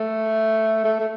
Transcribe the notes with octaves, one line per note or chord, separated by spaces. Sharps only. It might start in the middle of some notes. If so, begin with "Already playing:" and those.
Already playing: A3
A3
A3